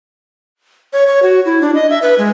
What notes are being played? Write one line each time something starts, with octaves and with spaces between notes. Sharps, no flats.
C#5
C#5
F#4
E4
D4
D#5
E5
B4
G#3